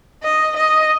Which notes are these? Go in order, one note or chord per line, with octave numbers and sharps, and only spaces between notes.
D#5
D#5